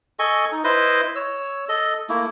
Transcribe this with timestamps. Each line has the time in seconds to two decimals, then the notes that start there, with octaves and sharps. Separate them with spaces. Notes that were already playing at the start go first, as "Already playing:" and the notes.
0.19 A4 D#5 G#5 C#6
0.52 D#4
0.64 E4 B4 C5 D#5
1.16 C#5 E6
1.69 A4 D#5
2.09 A3 A#3 E4